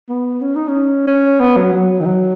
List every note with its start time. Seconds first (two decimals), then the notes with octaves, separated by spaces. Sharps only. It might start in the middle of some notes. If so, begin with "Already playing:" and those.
0.09 B3
0.41 C#4
0.55 D#4
0.68 C#4
1.07 C#4
1.40 B3
1.57 F#3
1.72 F#3
2.00 D#3
2.06 F#3